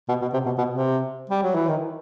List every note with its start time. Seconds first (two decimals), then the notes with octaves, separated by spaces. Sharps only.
0.09 B2
0.22 B2
0.33 C3
0.46 B2
0.58 B2
0.70 C3
1.29 G3
1.42 F#3
1.55 E3
1.68 D#3